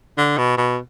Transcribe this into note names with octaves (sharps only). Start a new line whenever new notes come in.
D3
B2
B2